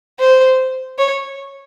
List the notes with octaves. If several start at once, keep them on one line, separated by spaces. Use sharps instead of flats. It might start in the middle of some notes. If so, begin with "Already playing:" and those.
C5
C#5